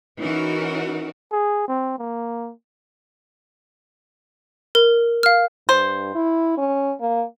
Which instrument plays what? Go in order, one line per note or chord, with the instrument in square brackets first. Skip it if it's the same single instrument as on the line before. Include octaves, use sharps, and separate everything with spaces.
[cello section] E3 C#4 D#4 F#4 A#4
[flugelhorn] G#4
C4
A#3
[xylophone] A#4
F5 F6
[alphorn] G2 [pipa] C5
[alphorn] E4
C#4
A#3